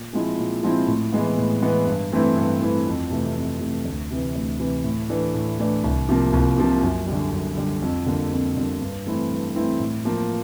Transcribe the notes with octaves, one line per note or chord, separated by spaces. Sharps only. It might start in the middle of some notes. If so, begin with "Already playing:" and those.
Already playing: A#2
F3 G#3 C4 E4
A#2
F3 G#3 C4 E4
A2
E3 G#3 B3
A2
E3 G#3 B3
G2
E3 A3 C4 E4
G2
E3 A3 C4 E4
F2
C3 E3 A3
F2
C3 E3 A3
D2
C3 E3
D2
C3 E3
A2
E3 A3 D4
A2
E3 A3 D4
C2
C3 F3 A#3
C2
C3 F3 A#3
F#2
G3
D3
F#2
D3 G3
F2
D3 G3 A#3
F2
D3 G3 A#3
G2
E3 A3 C4 E4
G2
E3 A3 C4 E4
A2
F3 A#3